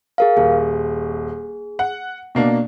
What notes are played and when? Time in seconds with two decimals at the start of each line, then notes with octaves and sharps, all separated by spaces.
0.18 G#4 A#4 F5
0.37 D#1 G#4
1.79 F#5
2.35 B2 A#3 D4